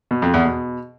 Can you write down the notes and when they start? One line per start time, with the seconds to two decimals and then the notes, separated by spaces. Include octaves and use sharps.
0.11 B2
0.22 F2
0.34 E2
0.45 B2